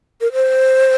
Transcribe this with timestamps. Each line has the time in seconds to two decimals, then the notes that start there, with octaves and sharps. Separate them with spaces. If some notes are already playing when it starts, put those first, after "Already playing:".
0.21 A#4
0.33 C5